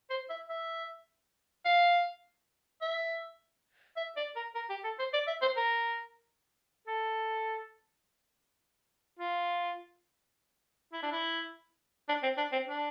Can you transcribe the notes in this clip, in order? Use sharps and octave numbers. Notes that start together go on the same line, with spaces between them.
C5
E5
E5
F5
E5
E5
D5
A#4
A#4
G4
A4
C5
D5
E5
C5
A#4
A4
F4
E4
D4
E4
D4
C4
D4
C4
D4